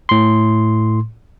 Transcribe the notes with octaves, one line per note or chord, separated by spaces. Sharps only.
A2 C6